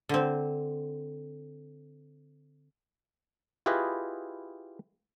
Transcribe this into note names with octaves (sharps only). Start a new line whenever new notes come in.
D3 C4
E4 F4 G4 G#4 B4 D#5